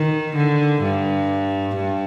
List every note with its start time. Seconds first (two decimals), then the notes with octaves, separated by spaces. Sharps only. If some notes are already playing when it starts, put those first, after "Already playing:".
Already playing: D#3
0.36 D3
0.82 G2
1.75 G2